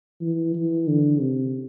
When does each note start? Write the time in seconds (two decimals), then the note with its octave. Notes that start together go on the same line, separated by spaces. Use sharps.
0.21 E3
0.55 E3
0.87 D3
1.20 C3